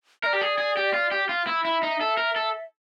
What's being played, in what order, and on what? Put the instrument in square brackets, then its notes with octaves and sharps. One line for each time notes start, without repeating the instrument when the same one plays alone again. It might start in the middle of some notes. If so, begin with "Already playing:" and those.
[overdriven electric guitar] A#4 [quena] D5 E5
[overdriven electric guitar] G4
G#4
G#4
G4
F4
G4
F4
E4
[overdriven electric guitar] E4 [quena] E5
[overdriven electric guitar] D#4
A4
A#4
A4